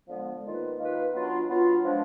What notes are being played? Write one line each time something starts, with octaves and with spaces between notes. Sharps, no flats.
D3 F3 G#3 B3
D#3 A#3 F4 B4
D#3 A#3 F4 B4
F#3 B3 D4 F4
F#3 B3 D4 F4
F3 G#3 D4